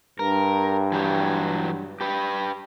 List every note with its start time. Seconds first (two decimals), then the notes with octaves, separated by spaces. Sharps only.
0.19 G2 A#4
0.92 E3 F#3 G4
2.01 G4 B4